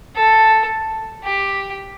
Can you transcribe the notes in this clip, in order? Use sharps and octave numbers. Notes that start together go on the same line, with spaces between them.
A4
G4